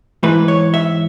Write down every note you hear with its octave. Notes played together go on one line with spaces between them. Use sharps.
G#2 E3 B4
C#5
E5